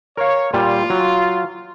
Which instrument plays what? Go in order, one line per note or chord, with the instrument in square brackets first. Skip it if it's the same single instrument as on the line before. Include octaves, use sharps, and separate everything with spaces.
[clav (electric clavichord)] A#4 F5 [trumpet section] C#5
[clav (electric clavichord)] A#2 G3 [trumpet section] F4
[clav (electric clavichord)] F#3